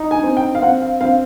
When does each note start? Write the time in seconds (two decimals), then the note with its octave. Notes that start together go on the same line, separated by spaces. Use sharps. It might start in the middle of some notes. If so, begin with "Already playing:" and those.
Already playing: D#4
0.11 G#5
0.23 C4
0.37 G5
0.55 F5
0.62 C4 F#5
0.81 F5
1.01 C4 F5